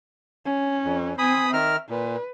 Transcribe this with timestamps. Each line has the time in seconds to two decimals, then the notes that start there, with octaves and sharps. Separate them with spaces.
0.45 C#4
0.85 F2
1.18 C4 G#5 B5 D#6
1.53 D#3 A#4 E5 F6
1.90 A#2 B4